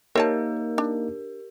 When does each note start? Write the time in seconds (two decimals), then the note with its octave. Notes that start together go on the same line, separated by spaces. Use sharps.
0.15 A#3 D#4 G4 A#4 C5 C#5 A5
0.78 D4